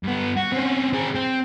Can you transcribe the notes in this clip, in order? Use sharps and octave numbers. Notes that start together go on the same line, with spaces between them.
G2 B3
F#4
C4 C#4
C4 G#4
C4